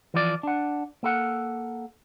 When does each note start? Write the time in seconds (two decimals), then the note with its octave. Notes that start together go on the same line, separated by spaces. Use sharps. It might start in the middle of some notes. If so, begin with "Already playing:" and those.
0.14 E3 F3 D5
0.43 D4 F#5
1.03 A#3 A4 F#5